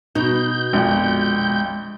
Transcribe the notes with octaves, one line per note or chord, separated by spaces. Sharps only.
B2 D#4 G6
A#1 F2 G#3